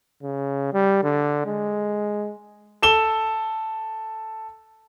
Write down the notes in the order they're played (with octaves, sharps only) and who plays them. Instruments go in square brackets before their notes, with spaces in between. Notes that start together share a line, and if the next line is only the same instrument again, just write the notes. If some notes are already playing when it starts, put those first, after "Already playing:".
[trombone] C#3
G3
D3
G#3
[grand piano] A4 E7 G7